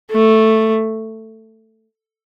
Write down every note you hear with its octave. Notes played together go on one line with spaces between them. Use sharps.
A3